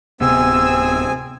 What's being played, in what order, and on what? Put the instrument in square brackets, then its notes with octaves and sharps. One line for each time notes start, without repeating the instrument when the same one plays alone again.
[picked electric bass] D1 C3 B3 [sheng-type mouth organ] C4 G#4 G#5 [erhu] E6